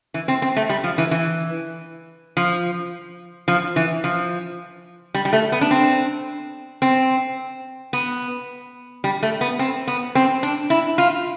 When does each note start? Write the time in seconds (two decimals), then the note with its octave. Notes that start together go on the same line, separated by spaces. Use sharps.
0.14 E3
0.28 C4
0.42 C4
0.56 A3
0.70 G3
0.84 F3
0.98 E3
1.11 E3
2.37 F3
3.48 F3
3.76 E3
4.04 F3
5.14 G3
5.25 G3
5.33 A3
5.52 B3
5.61 D4
5.71 C4
6.82 C4
7.93 B3
9.04 G3
9.23 A3
9.41 B3
9.59 C4
9.87 B3
10.15 C4
10.43 D4
10.70 E4
10.98 F4